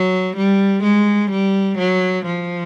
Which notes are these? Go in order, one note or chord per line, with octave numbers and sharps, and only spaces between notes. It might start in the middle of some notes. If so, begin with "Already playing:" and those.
Already playing: F#3
G3
G#3
G3
F#3
F3